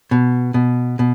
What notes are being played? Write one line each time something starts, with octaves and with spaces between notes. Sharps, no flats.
B2
B2
B2